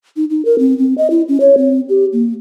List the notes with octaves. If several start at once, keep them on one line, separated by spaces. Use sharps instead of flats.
D#4
D#4
A#4
C4
C4
D#5
E4
C#4
C#5
C4
G4
A#3